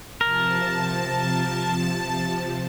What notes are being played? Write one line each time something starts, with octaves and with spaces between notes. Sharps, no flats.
C3 F3 A#4 A5